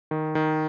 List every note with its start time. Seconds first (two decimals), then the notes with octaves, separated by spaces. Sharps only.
0.11 D#3
0.35 D#3